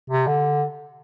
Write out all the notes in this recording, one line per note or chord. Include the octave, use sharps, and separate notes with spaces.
C3
D3